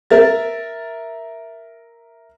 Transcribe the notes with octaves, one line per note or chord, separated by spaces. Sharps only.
A#4 E5 A6